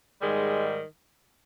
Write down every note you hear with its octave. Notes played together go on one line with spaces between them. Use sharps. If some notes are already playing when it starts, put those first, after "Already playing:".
G#2 D#3 G3 G#3